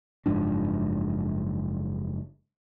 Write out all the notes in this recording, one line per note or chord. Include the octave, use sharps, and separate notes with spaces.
F#1 G#2 F3 D4